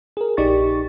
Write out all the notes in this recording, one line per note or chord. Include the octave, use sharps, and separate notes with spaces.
G#4 A#4
A#1 D#4 G4 D5 C#6 A6